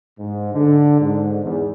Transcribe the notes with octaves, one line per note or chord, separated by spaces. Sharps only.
G#2
D3
G#2
E2